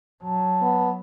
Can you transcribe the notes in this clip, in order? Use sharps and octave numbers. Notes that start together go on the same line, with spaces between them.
F#3 A5
B3